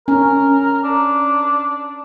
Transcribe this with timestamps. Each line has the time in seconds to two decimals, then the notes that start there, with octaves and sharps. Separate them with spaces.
0.08 C#4 A#4
0.84 D4